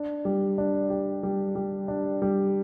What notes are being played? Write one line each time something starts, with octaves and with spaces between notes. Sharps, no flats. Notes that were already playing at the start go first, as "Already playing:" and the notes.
Already playing: D4
G3
D4
G4
G3
G3
D4
G3